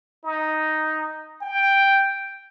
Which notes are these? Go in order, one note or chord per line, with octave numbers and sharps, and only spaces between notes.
D#4
G5